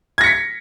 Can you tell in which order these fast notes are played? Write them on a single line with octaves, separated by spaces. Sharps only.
G#6 A#6 C#7 B6